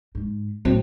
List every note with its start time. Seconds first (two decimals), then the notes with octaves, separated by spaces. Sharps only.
0.15 G#2
0.65 A2 F#3 C4